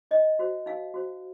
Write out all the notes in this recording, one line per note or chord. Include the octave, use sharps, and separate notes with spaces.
D#4 D#5
F#4 C5
D#4 F5
F#4 C5